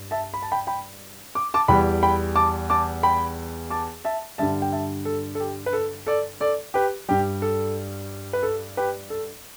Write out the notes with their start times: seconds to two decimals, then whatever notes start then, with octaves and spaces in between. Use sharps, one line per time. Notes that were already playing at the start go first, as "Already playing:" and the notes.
Already playing: G2
0.11 E5 A5
0.34 B5
0.42 A5
0.52 G5 B5
0.67 G5 B5
1.35 D6
1.54 A5 D6
1.68 E2 E3 G3 G5 B5
2.03 G5 B5
2.36 A5 D6
2.70 A5 D6
3.03 G5 B5
3.70 A5 D6
4.05 E5 A5
4.38 G2 D3 G3 E5 A5
4.62 G5
4.72 E5 A5
5.05 A4
5.35 A4
5.40 G4
5.66 B4
5.73 A4
6.07 A4 D5
6.40 A4 D5
6.74 G4 B4
7.09 G2 G3 G4
7.42 A4
8.33 B4
8.43 A4
8.77 G4 B4
9.10 A4